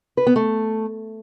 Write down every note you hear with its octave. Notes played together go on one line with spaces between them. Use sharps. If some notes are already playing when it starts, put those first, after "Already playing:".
B4
B3
A3